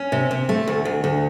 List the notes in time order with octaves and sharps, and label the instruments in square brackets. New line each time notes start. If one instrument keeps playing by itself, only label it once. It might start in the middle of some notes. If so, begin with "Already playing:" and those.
Already playing: [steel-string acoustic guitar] C#4
C3
C3
A3
D2
D2
D2